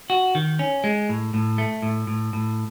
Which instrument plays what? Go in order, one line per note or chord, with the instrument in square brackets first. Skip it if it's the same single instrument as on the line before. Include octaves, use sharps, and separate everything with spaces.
[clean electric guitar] F#4
D#3
C#4
G#3
A2
A2
A3
A2
A2
A2